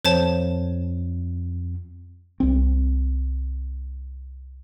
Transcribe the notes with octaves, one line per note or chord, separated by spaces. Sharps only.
F2 C5 C#5 A5
C2 C4